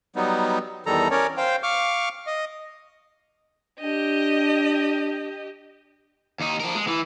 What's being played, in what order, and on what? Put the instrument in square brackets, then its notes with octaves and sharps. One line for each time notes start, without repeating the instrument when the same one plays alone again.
[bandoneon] F#3 G3 B3 D#4
E2 D#3 G3 A4 A#5
C#4 A#4 C#5 D5
C5 F5 G5
F5 C#6 D6 F6
D#5
[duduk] D4 [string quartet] G4 D#5
[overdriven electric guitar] D#2 D#4
F3 A#4
G#3
E3